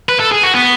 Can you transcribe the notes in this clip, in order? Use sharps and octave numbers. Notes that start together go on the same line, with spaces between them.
B4
A4
G#4
F#4
B3